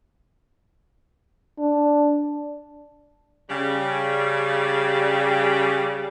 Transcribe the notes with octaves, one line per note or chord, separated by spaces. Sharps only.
D4
C#3 G3